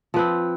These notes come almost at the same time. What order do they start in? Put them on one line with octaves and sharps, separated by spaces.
F3 B4 C4